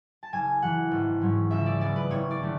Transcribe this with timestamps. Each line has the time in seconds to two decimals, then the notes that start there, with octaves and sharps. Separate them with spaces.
0.23 A5
0.33 F#1 G#5
0.62 F#2 E3 F#5
0.91 G#1
1.21 G#2 F#3 C#4
1.51 C#2 E5
1.66 D5
1.81 C#3 F#3 B3 D5
1.96 B4
2.10 F#1 C#5
2.31 D5
2.40 D3 A3 C#4